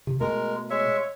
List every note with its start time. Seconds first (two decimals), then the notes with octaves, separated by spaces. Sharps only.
0.07 C3
0.21 B2 G#3 A3 A#4
0.70 G#3 C#5 E5